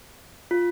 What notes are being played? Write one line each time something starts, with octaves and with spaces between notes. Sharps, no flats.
F4